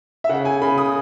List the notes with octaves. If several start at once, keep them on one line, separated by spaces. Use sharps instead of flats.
E5
C#3 F#5
G#5
C#3 B5
D#6